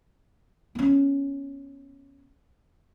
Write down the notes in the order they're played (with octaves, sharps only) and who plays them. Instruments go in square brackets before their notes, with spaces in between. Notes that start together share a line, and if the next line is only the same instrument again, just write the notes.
[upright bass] B3 C#4